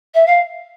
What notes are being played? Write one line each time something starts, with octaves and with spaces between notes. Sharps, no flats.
E5
F5